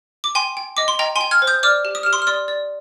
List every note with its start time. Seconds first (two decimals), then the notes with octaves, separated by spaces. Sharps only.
0.24 D6
0.35 G5 G#5 C6
0.57 G5
0.77 D#5 D6
0.88 C6
0.99 D#5 G5 A#5
1.16 G#5 C6
1.21 G5
1.31 F6 G#6
1.42 C5
1.47 D#6 G6
1.63 D5 D6 F6
1.85 G4
1.95 D#6
2.03 G4 F6
2.13 C6 D#6
2.22 F6
2.27 D5 C6 D#6
2.48 D5